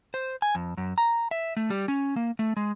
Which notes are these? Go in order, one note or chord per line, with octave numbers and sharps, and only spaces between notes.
C5
G#5
F2
F#2
A#5
E5
A3
G3
C#4
A#3
A3
G#3